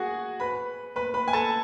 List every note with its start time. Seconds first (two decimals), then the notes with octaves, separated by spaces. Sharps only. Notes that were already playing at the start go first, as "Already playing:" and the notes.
Already playing: F#4 G#4 F#5 G#5
0.40 B4 B5
0.96 B4 B5
1.14 B4 B5
1.28 G#5
1.33 A4 A5